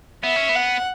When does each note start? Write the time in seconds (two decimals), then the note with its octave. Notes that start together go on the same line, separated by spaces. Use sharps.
0.23 B3 E5
0.36 C#4
0.49 B3
0.55 F#5